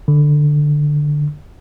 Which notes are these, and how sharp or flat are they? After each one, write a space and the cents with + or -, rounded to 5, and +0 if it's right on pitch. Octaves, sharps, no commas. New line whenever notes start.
D3 +10